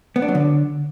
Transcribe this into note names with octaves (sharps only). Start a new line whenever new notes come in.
B3
D4
F#3
D3